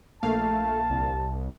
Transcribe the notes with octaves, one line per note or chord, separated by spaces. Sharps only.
A#1 A3 A#3 F5 A5
C2